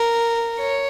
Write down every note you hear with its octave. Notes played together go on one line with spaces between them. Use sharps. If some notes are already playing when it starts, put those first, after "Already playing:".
Already playing: A#4
C#5